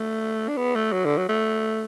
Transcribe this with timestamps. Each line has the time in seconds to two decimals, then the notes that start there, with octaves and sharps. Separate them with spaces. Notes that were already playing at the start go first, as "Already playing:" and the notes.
Already playing: A3
0.49 D4
0.57 B3
0.75 A3
0.93 F#3
1.05 D3
1.18 F#3
1.29 A3